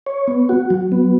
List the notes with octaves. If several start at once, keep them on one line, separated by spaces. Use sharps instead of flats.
C#5
B3
F#4
F#3
B3